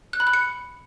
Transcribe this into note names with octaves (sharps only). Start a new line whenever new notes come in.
F#6
B5
F#6
C#7